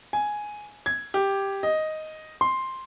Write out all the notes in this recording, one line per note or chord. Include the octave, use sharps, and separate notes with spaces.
G#5
G#6
G4
D#5
C6